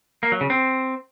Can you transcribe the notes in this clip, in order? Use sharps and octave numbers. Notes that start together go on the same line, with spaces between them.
A#3
F#3
C#3
C4